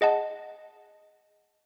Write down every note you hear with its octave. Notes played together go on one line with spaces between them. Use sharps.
G#4 D#5 F#5 A5